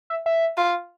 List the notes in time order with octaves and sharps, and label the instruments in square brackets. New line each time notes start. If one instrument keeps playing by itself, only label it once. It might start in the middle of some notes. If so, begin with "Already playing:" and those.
[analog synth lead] E5
E5
[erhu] F4